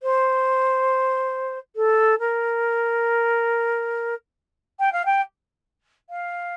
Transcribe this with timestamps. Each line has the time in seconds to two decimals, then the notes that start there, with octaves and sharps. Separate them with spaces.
0.02 C5
1.75 A4
2.19 A#4
4.79 G5
4.92 F5
5.05 G5
6.09 F5